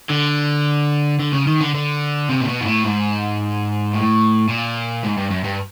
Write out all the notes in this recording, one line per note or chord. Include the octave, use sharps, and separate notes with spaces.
D3
D3
C#3
D#3
D3
D3
C3
A#2
B2
G#2
A2
G#2
A2
A#2
G#2
G2
F#2
G2